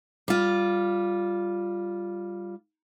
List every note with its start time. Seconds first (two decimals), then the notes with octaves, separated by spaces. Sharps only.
0.28 G3 F4